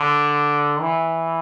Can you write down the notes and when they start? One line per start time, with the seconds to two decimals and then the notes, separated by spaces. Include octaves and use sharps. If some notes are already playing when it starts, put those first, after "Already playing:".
Already playing: D3
0.80 E3